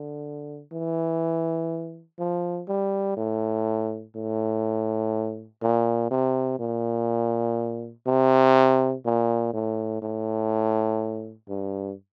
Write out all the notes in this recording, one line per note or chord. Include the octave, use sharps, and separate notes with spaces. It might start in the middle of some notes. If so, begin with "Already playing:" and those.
Already playing: D3
E3
F3
G3
A2
A2
A#2
C3
A#2
C3
A#2
A2
A2
G2